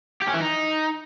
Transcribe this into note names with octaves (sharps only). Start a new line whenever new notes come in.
G4
C#4
E3
D#4